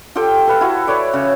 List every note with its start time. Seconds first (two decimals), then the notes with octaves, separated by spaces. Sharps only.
0.15 F4 G4 A4 G5
0.47 A4 B4 F5
0.61 E4 F#4
0.88 B4 C#5 D5
1.13 C#3